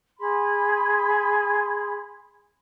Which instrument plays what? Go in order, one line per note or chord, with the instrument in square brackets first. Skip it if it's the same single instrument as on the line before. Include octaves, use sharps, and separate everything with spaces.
[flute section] G#4 B5 C6